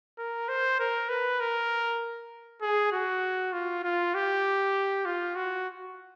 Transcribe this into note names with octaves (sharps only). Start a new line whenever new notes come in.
A#4
C5
A#4
B4
A#4
G#4
F#4
F4
F4
G4
F4
F#4